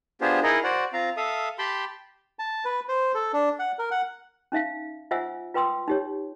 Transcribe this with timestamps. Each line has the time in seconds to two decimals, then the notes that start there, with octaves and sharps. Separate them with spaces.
0.21 B3 D4 F4 G4 G#4 C5
0.43 D#4 E4 G#4 A#4 D#5
0.64 F#4 C5 D5 F#5
0.93 C4 F4 F5 A#5
1.17 A4 E5 F5 D#6
1.58 G4 G5 A5 B5 C6
2.39 A5
2.65 B4
2.89 C5
3.14 A4
3.33 D4
3.59 F#5
3.79 A#4
3.91 F#5
4.52 C#4 D#4 E5 F5
5.11 F4 C5 E5 F#5 G#5 E6
5.54 F4 B4 G5 C6 D#6 E6
5.88 D#4 G4 C#5